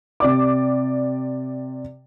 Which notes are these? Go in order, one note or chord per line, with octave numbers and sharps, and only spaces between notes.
C3 D5 D6